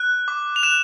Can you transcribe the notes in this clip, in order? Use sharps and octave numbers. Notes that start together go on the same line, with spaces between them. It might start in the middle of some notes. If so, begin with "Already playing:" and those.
Already playing: F#6
D6
F7
F#6 E7